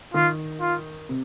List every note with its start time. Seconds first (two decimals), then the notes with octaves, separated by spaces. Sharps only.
0.14 D#3 F4
0.61 F4
1.09 C3